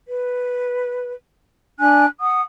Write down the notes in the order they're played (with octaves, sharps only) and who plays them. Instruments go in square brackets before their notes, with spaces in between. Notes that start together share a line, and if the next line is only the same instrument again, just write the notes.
[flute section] B4
D4 G#5 F#6
F#5 D#6